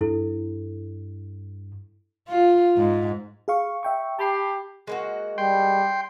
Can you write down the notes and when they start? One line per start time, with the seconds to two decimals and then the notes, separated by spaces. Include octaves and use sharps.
0.01 G2 E4 A4
2.29 F4
2.77 G#2
3.48 G#4 F5 C#6
3.83 E5 G5 C#6
4.19 G4 A5 B5 C7
4.87 G#3 A#3 F#4
5.38 G3 G5 C6